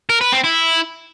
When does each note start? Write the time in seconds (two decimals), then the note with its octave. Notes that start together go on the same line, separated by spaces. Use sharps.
0.09 A#4
0.21 B4
0.32 C4
0.44 E4